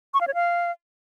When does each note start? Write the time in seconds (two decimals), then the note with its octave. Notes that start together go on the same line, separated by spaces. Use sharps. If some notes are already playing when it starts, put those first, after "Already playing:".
0.14 C#6
0.21 F5
0.28 C#5
0.34 F5